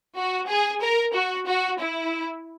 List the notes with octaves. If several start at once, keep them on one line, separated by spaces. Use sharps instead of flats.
F#4
G#4
A#4
F#4
F#4
E4